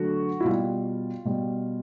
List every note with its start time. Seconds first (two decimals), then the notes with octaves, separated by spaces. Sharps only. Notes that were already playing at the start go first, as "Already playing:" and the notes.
Already playing: D3 F#3 A3 F#4
0.40 E4
0.44 B2 G3 F4
1.25 B2 G3